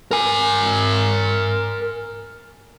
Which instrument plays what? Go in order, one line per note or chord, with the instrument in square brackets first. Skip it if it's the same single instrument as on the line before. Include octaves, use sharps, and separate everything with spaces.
[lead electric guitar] A#4 G#5